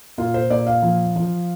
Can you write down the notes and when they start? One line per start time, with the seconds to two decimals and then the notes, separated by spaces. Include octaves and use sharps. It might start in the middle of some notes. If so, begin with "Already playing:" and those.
0.18 A#2 F4
0.34 C5
0.50 A#2 D5
0.67 F5
0.82 F3
1.16 F3